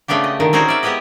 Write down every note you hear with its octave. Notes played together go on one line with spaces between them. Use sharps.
C#3 A3 B3 D4 G4
D#5
A#2 D3 D#3
C4 C#4 D#4 F#4 G#4 A#4
D5 E5
G#3 B3 E4 G4 B4 D#5